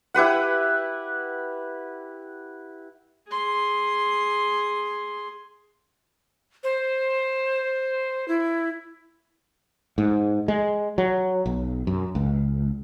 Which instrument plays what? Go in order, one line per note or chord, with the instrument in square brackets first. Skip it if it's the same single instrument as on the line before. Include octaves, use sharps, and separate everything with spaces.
[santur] E4 G4 B4 F#5
[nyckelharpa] G#4 C6
[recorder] C5
E4
[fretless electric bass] G#2
G#3
F#3
B1
F#2
C#2